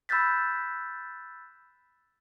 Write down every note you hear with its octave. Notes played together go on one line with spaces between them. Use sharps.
B5 E6 F#6 G6 A6 B6